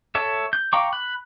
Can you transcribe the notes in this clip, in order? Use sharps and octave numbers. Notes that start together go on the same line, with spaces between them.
A4 C#5 E5
G6
F5 G5 A#5 C#6 D6
B5 F#6